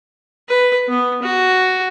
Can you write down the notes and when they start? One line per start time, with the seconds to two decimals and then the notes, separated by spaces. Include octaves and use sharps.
0.48 B4
0.88 B3
1.22 F#4